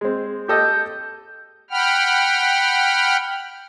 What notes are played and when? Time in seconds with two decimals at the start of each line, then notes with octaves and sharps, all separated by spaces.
0.01 G#3 C4
0.48 G4 A4 D#5 G6
1.70 F#5 G5 B5 F6